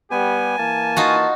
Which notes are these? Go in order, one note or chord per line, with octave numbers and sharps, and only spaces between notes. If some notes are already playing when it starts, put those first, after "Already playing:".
G3 B3 G4 G#5
E3 A#3 A5
D#4 F4 F#4